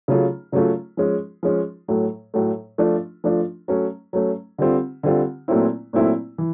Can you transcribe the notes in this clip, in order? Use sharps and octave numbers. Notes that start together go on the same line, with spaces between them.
C#3 F#3 A3 C#4 F4
C#3 F#3 A3 C#4 F4
F3 G#3 C#4
F3 G#3 C#4
A2 F#3 A3
A2 F#3 A3
F3 A3 D4 F4
F3 A3 D4 F4
F#3 A3 C#4
F#3 A3 C#4
D3 G3 C4 F4
D3 G3 C4 F4
A#2 F#3 A3 C4 E4
A#2 F#3 A3 C4 E4
E3